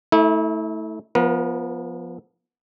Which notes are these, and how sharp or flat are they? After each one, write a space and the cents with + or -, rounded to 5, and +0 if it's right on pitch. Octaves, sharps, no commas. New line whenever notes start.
A3 +0 E4 -35
F3 +0 B3 -15 A#4 +40